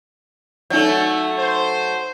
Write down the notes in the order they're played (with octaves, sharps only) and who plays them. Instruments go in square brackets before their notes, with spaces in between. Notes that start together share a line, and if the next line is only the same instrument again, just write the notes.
[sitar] F#3 A3 [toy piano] D#4 D5
[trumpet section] C5